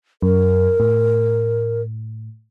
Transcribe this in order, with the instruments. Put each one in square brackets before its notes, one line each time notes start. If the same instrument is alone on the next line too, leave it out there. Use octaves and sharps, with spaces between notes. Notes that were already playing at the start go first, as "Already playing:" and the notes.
[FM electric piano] F#2 [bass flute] A#4
[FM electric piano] A2